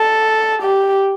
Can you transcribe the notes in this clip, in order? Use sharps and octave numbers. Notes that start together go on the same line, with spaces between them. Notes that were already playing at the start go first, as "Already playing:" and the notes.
Already playing: A4
G4